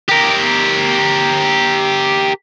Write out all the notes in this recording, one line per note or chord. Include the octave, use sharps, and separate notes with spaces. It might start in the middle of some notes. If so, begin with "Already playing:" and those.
G4 A#4